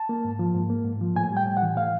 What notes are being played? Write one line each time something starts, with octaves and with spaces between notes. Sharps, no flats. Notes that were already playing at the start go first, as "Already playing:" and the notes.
Already playing: A5
A#3
G#2
F3
G#2
A#3
G#2
F3
A2 G#5
G3 G5
A2
F#5
E3
A2 F5